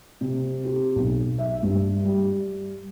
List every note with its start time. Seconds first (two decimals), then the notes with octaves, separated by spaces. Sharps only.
0.21 C3
0.65 G4
0.96 B1
1.38 E5
1.63 G2
2.05 G3